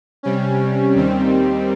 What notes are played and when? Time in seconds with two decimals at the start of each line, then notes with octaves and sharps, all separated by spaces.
0.23 C3 G3 C#4
0.95 D#2 D#3 G3 C4